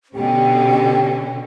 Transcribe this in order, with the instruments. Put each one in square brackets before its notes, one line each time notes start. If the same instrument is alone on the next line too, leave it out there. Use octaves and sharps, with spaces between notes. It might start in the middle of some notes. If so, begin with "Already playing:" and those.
[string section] B2 D3 C#4 [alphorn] G4 [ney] G5